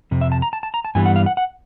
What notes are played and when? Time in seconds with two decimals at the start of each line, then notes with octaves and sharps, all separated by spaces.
0.11 F2 C3
0.21 E5
0.32 A5
0.42 A#5
0.53 A5
0.63 A5
0.74 A#5
0.85 A5
0.95 G2 E3 G3 B3 G#5
1.06 F#5
1.16 F5
1.26 F#5
1.37 F#5